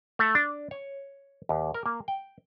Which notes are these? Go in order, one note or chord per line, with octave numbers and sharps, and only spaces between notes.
A3
D4
C#5
D#2
A#4
A#3
G5